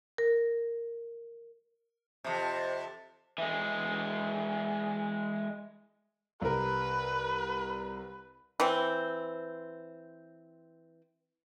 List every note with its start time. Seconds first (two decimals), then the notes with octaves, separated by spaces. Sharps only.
0.18 A#4
2.24 F2 C3
3.38 E3 G#3
6.42 C2 A#4 B4
8.60 E3 C4